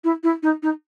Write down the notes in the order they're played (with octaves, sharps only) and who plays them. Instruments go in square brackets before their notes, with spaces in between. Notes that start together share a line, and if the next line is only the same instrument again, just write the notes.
[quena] E4
E4
D#4
D#4